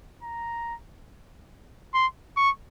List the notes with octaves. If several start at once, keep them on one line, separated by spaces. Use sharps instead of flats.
A#5
C6
C#6